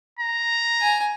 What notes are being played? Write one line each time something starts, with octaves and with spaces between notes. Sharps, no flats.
A#5
G#5